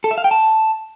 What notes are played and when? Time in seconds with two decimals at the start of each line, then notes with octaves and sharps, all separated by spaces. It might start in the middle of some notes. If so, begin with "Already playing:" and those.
0.04 A4
0.11 E5
0.18 F5
0.24 G5
0.31 A5